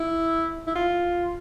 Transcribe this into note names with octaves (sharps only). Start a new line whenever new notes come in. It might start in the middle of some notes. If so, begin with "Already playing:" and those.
Already playing: E4
E4
F4